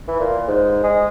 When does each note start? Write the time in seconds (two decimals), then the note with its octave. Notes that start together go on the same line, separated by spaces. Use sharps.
0.08 E3
0.19 A#2
0.48 G#2
0.84 G#3